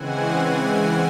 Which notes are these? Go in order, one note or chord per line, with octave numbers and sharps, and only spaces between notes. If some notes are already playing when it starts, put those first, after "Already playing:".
Already playing: C#3 E3 G#3 C4 F#5 G#5